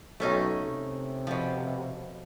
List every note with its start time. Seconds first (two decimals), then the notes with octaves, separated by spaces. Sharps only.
0.20 B1 A3 C#4 D#4
0.62 C3
1.27 B2 F3